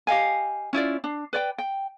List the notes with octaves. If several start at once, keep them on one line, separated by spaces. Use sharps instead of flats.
G4 D#5 F5 G#5
C#4 E4 F4 D5
D4
B4 D5 G5
G5